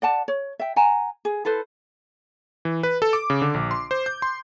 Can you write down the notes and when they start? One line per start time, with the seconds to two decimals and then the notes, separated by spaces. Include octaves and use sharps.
0.02 D5 F#5 A5
0.28 C#5
0.59 E5 G5
0.76 F#5 G#5 A#5
1.25 G#4
1.45 E4 A4 B4 C5
2.65 E3
2.83 B4
3.02 A4
3.13 D6
3.30 C#3
3.42 D3
3.54 A#1
3.71 C6
3.91 C5
4.06 G6
4.22 C6